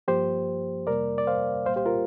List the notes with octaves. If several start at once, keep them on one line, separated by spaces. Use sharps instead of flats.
G2 F3 A#3 G4 C5
F2 C3 G3 A#3 A#4 D5
D5
C5 F5
C2 A#2 G3 A#3 C5 F5
G4 C5
F4 A#4